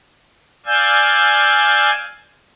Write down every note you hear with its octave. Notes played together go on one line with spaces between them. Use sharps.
D5 F5 G#5 E6 G6 G#6